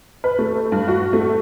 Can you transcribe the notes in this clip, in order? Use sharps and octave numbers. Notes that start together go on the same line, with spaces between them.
B4
A3
G2
F#4
A3